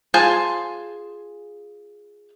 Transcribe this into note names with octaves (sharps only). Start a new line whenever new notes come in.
F4 G#4 C5 G#5 A5